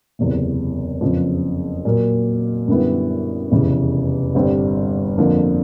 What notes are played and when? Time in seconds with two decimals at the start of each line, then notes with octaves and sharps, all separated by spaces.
0.19 F#1 E2 C3
1.01 F#1 F2 C#3 F3
1.85 A#2 F#3 A#3
2.67 F#2 D3 G3 B3 E4
3.51 F1 E2 C#3 E3
4.35 G1 G2 D3 G3 C4
5.18 F2 D3 F3 A#3